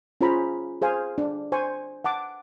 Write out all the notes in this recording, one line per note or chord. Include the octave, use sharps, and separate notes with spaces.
C#4 F4 G#4 C5 A#5 B5
G#4 C5 F5 G#5
D4
C5 G#5 C#6
F#5 A5 D6